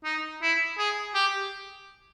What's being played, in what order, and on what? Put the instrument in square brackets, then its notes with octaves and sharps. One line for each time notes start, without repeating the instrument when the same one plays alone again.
[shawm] D#4
E4
G#4
G4